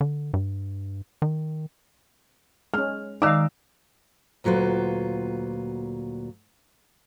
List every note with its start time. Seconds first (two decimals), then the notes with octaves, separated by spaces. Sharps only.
0.01 D3
0.34 G2
1.22 D#3
2.74 G#3 C#4 F6
3.22 D#3 G#3 D#4 D5 F5 D6 E6
4.44 D2 A#2 F#3 F4 B4